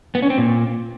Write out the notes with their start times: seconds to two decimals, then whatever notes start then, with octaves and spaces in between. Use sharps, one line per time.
0.15 B3
0.22 C#4
0.30 C4
0.38 A#2